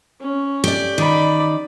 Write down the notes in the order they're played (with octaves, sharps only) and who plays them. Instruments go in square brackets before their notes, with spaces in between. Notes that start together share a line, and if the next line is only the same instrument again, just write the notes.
[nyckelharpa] C#4
[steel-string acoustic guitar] G4 D5
[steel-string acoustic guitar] D#3 [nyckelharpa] D5 B5